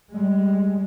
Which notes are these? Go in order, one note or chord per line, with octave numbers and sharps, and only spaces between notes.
G3 G#3